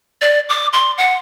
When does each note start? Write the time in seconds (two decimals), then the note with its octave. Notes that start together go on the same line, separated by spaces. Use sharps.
0.21 D5
0.49 D6
0.73 C6
0.98 F#5